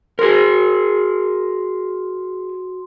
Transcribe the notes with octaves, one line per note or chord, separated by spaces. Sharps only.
F#4 G#4 A#4 C6